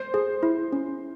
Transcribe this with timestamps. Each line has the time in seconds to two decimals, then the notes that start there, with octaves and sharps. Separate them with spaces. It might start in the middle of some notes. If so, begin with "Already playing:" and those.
Already playing: C5
0.14 G#4
0.43 E4
0.72 C#4